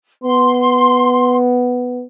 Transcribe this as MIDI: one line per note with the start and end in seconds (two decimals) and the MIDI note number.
0.24 2.04 59
0.24 1.35 84